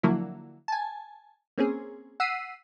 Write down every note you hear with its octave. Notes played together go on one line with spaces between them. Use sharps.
D3 F3 F#3 A#3 E4
G#5 A5
A#3 C4 C#4 G#4
F#5 E6 B6 C7 D#7